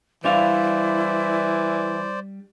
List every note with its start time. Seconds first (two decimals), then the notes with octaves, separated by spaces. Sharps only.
0.24 E3 G3 D4 E4 C5 D5 F5